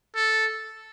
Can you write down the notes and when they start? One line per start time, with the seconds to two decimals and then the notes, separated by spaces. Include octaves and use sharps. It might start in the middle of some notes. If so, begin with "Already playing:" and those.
0.15 A4